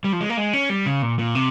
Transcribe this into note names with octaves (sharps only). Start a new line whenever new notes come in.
G3
F3
G#3
A#3
G#3
C#4
G3
C#3
A#2
A#2
C3